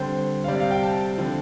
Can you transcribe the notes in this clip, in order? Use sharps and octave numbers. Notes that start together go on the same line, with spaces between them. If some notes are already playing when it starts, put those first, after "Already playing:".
Already playing: D3 G3 C4 C5
F5
C3 G3 C4 D5
F5
G5
A5
D3 F3 C4